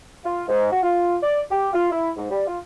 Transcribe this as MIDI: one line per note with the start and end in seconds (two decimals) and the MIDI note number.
0.24 0.44 65
0.48 0.69 44
0.71 0.80 66
0.83 1.17 65
1.23 1.40 74
1.50 1.69 67
1.73 1.87 65
1.91 2.10 64
2.17 2.26 44
2.30 2.45 55
2.47 2.58 65